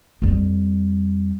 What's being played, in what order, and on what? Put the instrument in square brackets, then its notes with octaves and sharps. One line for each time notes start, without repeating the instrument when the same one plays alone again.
[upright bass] F2 G3